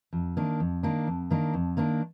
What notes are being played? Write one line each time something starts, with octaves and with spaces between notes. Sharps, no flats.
F2
D#3 A#3 D4
F2
D#3 A#3 D4
F2
D#3 A#3 D4
F2
D#3 A#3 D4